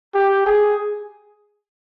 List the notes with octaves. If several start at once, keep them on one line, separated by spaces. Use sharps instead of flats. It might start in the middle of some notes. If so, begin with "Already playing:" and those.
G4
G#4